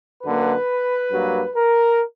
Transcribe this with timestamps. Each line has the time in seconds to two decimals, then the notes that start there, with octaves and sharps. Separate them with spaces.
0.23 F#2 D3 A#3 B4
1.11 G2 F#3 A#3
1.55 A#4